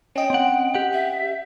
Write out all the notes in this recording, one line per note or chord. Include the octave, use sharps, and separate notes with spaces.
C#4 D#5 G5
C4 F#5
G4 F#5
E5